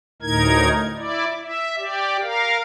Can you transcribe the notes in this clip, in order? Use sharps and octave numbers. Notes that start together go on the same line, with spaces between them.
D2 A2 D#4 A#4 G#6
E4 D5
E5
G4 D5
A#4 F5